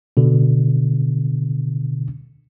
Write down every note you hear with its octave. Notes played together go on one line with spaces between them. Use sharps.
B2 D3